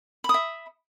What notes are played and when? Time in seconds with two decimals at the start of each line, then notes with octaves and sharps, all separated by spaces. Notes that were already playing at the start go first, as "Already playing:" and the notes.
0.24 B5
0.29 D#6
0.34 E5